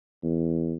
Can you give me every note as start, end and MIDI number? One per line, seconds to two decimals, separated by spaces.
0.23 0.74 40